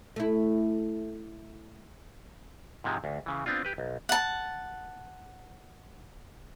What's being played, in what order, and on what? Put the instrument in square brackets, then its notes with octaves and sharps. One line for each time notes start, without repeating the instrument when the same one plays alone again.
[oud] A3 E4
[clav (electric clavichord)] G#2 C3 F3 G#3
D2
C#3 E3
B3 C4 D4 F4
G4 B4
B1
[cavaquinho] F#5 A5